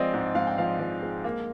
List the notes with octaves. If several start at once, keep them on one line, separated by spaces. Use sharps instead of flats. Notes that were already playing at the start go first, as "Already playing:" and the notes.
Already playing: F3 G#3 C4 D5 D#5 F5
G#2
G#2 F5
G5
F3 F5
F3
G#3
A#3